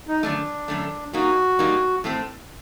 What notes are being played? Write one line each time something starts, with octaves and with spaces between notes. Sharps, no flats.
D#4
F#2 D3 A3 D4
F#2 D3 A3
A#2 G3 A#3 D#4 F#4
A#2 G3 A#3 D#4
A2 A3 C4